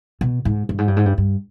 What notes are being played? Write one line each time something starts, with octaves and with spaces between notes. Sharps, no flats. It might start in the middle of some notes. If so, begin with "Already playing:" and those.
B2
G#2
G2
G#2
G2
G#2
G2
G2